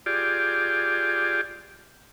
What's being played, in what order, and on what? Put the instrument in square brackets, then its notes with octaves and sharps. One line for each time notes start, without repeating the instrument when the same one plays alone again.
[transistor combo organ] F4 G4 G#4 D5